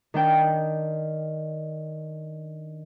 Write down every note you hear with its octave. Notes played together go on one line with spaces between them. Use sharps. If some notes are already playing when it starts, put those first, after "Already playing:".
D#3 D4 G5